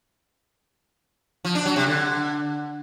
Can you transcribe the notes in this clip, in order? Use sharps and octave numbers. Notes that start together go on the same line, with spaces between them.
F3
D4
F#3
C3
D3